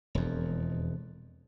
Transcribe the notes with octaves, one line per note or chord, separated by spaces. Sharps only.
E1 F2